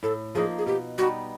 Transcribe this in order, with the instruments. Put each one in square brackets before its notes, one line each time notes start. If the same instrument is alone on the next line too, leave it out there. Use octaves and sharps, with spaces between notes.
[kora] A2 [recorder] A4
[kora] F3 A#3 D#4 [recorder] G#4
[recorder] G#4
[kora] B2 [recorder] G4
[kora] G3 B3 D#4 [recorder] F#4